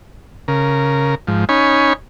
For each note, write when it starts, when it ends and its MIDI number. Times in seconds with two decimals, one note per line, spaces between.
0.48 1.15 49
0.48 1.15 70
1.27 1.45 44
1.27 1.45 53
1.49 1.93 61
1.49 1.93 63
1.49 1.93 73
1.49 1.93 80
1.49 1.93 83